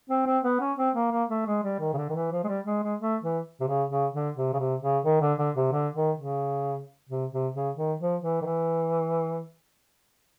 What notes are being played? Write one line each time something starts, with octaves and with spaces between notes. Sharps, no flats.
C4
C4
B3
C#4
C4
A#3
A#3
A3
G#3
G3
D#3
C#3
D3
D#3
E3
F3
G#3
G3
G#3
G#3
A3
E3
C3
C#3
C#3
D3
C3
C#3
C3
C#3
D#3
D3
D3
C3
D3
D#3
C#3
C3
C3
C#3
D#3
F3
E3
D#3
E3